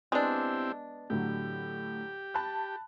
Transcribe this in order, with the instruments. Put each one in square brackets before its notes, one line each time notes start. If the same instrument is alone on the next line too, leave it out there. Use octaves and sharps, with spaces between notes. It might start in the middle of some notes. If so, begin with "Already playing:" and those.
[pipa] G#3 D4 [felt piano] B3 [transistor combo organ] C4 E4 G4
[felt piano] A2 D3 F#3 [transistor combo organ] G4
[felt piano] A5 B5 F#6